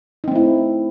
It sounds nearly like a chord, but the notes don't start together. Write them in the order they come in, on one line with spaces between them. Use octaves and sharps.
D#4 C4 A3 E4